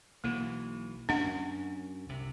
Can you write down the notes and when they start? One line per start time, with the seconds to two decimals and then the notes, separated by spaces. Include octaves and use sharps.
0.24 B1 E3 A#3
1.09 F#2 C#4 D4 F#5
2.09 C2 C3